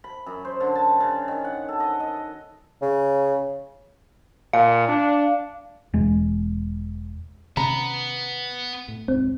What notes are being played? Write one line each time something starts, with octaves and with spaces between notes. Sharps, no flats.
B5
F#2
C5
D3
A5
C#3
D#3
F#5
A4
D#5
D#5
C#3
A#2 F5
D4
E1 G#3
C3 D#3 B3 C#4 A#5 B5
A2
D1 B1 G#2 C4